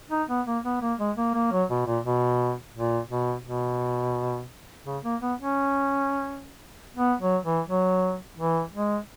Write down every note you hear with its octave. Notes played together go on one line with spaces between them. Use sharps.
D#4
B3
A#3
B3
A#3
G#3
A#3
A#3
F#3
B2
A#2
B2
A#2
B2
B2
C#3
A#3
B3
C#4
B3
F#3
E3
F#3
E3
G#3